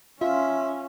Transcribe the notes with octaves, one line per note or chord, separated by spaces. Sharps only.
C#4 F4 E5